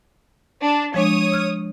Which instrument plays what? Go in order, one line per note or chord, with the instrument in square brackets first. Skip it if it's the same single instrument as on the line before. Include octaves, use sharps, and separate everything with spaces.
[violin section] D4
[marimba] F3 G#3 D4 [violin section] C#5 D#6
[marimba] E6 F6 G#6